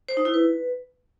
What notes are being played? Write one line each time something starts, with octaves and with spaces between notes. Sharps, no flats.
C5
D#4
E4
B4